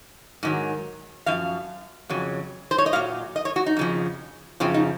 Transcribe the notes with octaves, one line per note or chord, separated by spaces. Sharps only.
G#2 D#3 F#3
F#2 F3 F5
F2 C#3 F#3
C5
C#5
D#5
A#2 F#3 F5
D#5
C#5
F#4
D#4
F2 C#3 F3
F#2 C#3 F3 C4
D#4